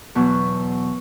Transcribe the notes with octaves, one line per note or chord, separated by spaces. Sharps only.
E2 B2 F#3